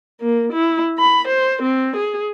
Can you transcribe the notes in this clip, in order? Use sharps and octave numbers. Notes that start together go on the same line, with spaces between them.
A#3
E4
B5
C5
C4
G#4